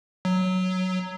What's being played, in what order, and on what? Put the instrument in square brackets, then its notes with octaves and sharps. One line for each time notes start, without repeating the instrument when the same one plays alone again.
[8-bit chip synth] F#3